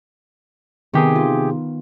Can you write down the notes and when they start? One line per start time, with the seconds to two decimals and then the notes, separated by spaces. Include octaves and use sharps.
0.94 C3 D#3 B3 G4 G#4
1.15 F4